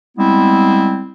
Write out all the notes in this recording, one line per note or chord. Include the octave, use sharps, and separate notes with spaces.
G3 G#3 B3 C4 E4